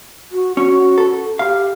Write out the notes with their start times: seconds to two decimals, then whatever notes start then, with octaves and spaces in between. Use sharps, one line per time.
0.32 F#4
0.57 C#4 F#4
0.98 A4
1.39 G4 F5